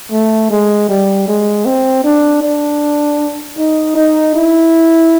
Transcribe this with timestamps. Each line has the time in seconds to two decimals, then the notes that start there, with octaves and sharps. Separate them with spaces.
0.12 A3
0.51 G#3
0.89 G3
1.28 G#3
1.66 C4
2.04 D4
2.42 D4
3.58 D#4
3.96 D#4
4.35 E4